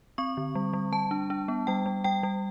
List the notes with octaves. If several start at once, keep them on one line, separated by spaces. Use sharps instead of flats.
C4 C#6
D3
G3
G3
G3 A5
D4
D4
B3
G3 G5
G3
G3 G5
G3